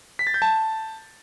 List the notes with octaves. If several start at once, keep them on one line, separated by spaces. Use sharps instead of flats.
B6
A6
G6
A5